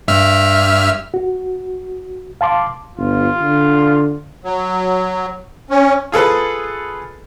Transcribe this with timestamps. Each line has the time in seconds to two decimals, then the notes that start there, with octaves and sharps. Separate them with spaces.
0.08 G2 E5 F6
1.14 F#4
2.41 F5 A5 C6 D6
2.98 G1 F4
3.42 D3
4.44 F#3
5.70 C#4
6.12 F4 G#4 A4 B4